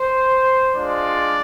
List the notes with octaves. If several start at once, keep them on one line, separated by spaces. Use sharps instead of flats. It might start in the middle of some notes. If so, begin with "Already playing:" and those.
Already playing: C5
G#3 D4 F4 D5